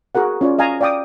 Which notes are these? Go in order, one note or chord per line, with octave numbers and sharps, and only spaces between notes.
F#4 G#4 A#4 F#5
C#4 F4 C#5 D5
D#5 F5 G#5 A#5
D5 F5 G5 D6 D#6